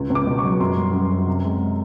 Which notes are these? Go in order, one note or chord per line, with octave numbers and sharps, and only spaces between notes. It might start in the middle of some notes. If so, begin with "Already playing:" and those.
Already playing: C#2
C#2
D6
B2
C#6
F#3
F#2 C6
G3
F#2
F#2
C3
G#3